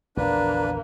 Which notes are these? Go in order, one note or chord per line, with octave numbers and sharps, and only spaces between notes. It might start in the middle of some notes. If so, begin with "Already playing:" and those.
A#1 E2 D3 A#3 D4 B4